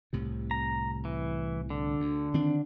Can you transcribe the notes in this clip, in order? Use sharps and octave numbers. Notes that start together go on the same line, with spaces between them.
C2 A2 C3
A#5
E3
D3
D2
D#3 C4 D4